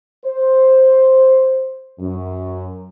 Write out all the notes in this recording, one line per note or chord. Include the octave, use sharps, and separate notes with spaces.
C5
F#2